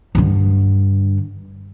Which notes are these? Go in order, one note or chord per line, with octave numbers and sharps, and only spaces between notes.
G2 D3